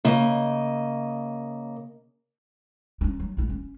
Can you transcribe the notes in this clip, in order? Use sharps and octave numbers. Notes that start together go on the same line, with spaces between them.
C#3 A#3 D#5
C#4 D4
F#3
A#1 E4
C#4